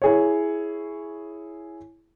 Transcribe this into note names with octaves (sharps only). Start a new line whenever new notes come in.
E4 G#4 C#5